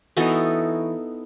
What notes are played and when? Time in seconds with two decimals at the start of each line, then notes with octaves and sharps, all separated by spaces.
0.17 E3 B3 D#4 F#4 A4